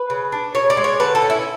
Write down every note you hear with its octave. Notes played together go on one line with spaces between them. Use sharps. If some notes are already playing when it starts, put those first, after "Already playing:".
Already playing: B4
C#3
D4
C#3 C#5
D5
G#3
C#5
D3 B4
A4
C#4
E4